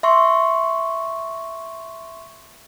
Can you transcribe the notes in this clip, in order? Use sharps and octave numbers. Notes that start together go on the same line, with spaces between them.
E5 C6 C#6